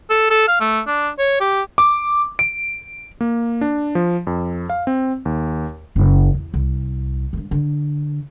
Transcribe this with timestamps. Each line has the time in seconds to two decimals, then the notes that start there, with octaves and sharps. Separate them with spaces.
0.10 A4
0.30 A4
0.48 F5
0.60 A3
0.87 D4
1.19 C#5
1.40 G4
1.78 D6
2.39 D7
3.21 A#3
3.61 D4
3.95 F3
4.27 F2
4.70 F5
4.87 C4
5.25 D#2
5.96 F#1
6.34 E2
6.54 C2
7.33 G2 E3
7.51 D3